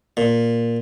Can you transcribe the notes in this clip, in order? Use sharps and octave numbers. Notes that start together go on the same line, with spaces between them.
A#2